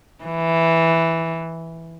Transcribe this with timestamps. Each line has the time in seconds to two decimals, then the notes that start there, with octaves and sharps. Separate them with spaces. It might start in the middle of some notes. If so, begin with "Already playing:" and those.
0.24 E3